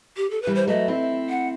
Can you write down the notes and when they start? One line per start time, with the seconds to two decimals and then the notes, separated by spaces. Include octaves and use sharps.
0.17 G4
0.31 A4
0.42 B4
0.47 E3 G3
0.55 C5
0.67 F#3 A3 D#5
0.88 C4 E4
1.30 F#5